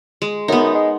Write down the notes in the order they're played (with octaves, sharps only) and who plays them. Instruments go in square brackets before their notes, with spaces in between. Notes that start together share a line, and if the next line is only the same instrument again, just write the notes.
[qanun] G#3
[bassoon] F#2 [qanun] B3 D#4
[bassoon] G#3